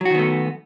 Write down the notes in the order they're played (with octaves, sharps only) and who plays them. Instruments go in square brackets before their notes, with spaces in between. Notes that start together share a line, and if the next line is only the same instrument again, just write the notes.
[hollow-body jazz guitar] F#3
F#4
D#3
B3
A3